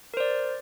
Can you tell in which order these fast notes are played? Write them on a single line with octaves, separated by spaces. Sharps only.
A#4 C5 D5